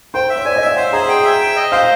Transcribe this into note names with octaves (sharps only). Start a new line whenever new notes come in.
C5 G5
E5
C#5
D5 G#5
D#5
E5 F5
C5 F#5
G#4 A#5
G5
E5
G5
D#5
C5 F5